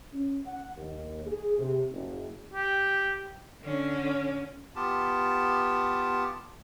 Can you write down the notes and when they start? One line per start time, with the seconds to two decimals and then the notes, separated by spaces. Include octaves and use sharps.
0.13 C#4
0.46 F#5
0.77 D#2
1.26 G#4
1.58 C3
1.91 F#1
2.54 G4
3.63 D3 C#4
4.76 B3 F4 G4 A5